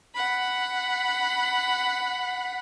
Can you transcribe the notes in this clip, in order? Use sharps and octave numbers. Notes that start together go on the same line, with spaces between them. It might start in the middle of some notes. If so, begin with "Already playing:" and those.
F#5 B5